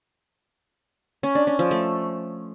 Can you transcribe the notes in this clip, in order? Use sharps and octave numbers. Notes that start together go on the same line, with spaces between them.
C#4
D4
C#4
F3
A3